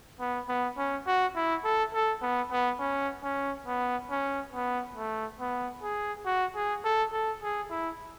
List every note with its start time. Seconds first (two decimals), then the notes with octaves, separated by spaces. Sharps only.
0.20 B3
0.49 B3
0.78 C#4
1.07 F#4
1.35 E4
1.64 A4
1.94 A4
2.22 B3
2.51 B3
2.79 C#4
3.23 C#4
3.67 B3
4.10 C#4
4.53 B3
4.96 A3
5.40 B3
5.83 G#4
6.26 F#4
6.55 G#4
6.85 A4
7.12 A4
7.42 G#4
7.70 E4